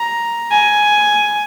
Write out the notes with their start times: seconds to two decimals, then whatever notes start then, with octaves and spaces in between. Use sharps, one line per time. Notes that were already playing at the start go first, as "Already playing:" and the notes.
Already playing: A#5
0.51 G#5